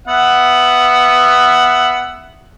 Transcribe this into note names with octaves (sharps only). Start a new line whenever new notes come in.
B3 E5 F#5